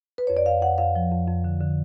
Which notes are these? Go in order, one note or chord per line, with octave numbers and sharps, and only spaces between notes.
B4
F2 C#5
D5
F2 F5
F2 F#5
F2 F5
F3
F2
F2
D3
D3